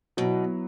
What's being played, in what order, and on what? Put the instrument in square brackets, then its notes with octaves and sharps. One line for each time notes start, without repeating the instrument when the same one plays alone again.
[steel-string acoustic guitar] B2 [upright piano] F#3 B3 E4